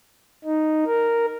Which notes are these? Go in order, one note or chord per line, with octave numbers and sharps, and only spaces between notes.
D#4
A#4